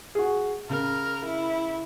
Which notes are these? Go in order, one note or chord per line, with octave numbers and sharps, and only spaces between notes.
F#4 G#4
C#3 A#4
E4